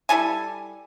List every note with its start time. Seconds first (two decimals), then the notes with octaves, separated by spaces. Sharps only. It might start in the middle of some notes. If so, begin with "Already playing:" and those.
0.09 G3 E4 A4 G#5